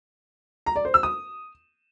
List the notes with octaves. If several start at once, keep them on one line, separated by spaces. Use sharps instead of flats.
A#5
D5
C5
E6
D#6